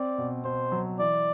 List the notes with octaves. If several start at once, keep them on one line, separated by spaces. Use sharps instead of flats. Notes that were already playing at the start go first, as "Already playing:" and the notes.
Already playing: C4 D5
B2
B2 C5
F#3
E3 D5